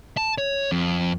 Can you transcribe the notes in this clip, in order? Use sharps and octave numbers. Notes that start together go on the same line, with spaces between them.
A5
C#5
F2